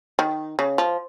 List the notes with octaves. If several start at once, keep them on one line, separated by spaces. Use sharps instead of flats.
D#3
C#3
F3